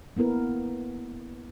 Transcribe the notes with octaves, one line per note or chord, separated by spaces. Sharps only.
A#3 B3 E4 A#4 B4